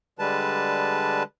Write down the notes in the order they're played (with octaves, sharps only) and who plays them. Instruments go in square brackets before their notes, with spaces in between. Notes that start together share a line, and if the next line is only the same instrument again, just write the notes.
[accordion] D3 G3 G#3 B4 A5